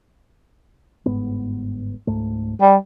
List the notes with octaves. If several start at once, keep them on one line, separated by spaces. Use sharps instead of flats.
G1 G#2 B3
C#2 G#2 A3
G3